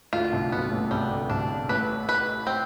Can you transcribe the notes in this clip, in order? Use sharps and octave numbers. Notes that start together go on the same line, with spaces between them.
D2 D3 F4
C2 C3
B1 B2 B3
A1 A2
C2 C3 G3
D2 D3
C2 C3 D4
A1 A2 B4
B4
C4